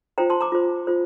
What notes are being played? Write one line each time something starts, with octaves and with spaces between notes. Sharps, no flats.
F4 C5 G5 A#5
A5 C6
A#5 D6
F4 C5
F4 C5